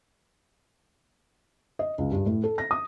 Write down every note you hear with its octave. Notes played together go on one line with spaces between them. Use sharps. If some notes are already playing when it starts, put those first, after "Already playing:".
D#5
C#2
G2
A2
A4
A#6
D#6